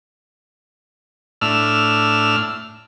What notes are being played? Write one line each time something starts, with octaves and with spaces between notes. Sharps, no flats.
A2 D4 E6 F6